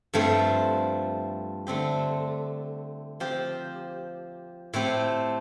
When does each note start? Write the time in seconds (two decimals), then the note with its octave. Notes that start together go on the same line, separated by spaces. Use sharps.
0.13 G2 F3 A3 C4
1.67 D3 A3 C4 G4
3.20 F3 C4 G4
4.73 A2 A3 C4 G4